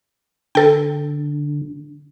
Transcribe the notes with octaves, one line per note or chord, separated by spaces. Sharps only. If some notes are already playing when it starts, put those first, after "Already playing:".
D3 A4 G5